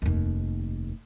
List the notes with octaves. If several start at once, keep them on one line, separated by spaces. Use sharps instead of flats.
F1 D#2